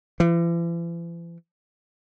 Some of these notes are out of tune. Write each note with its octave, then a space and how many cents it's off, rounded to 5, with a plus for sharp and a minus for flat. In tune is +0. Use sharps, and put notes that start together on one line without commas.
E3 +45